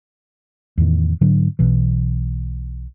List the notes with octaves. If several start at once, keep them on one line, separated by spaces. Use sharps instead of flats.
E2 A2 D#3
G#2 D3 F#3 D4
B1 B2 E3